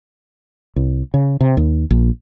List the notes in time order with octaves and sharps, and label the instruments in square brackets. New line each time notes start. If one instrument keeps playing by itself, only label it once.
[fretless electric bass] C2
C#3
C3
D#2
A#1